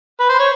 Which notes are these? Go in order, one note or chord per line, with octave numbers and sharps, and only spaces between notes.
B4
C5
C#5